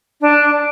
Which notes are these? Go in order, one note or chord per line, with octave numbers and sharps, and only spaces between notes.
D4